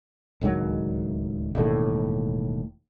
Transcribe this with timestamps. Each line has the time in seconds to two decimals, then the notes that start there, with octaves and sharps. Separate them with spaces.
0.41 D1 C#2 D#3 F#3
1.55 E1 D#2 A2